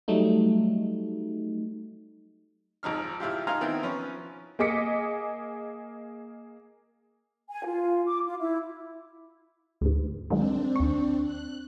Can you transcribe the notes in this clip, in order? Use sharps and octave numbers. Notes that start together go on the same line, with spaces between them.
F#3 G3 A3 D#4
G#1 F3 D#4 F6
G#1 E4 F4 G4
D#4 F4 F5 G#5 A#5 C6
D#3 B3 C4 D#4 E4
F3 C#4 B4
A#3 G#4 D#5 D6 B6 C#7
G#5
F4
D6
F4
E4
D2 G#2
D#3 F#3 G#3 C4 D4
D#2 C#6
F#6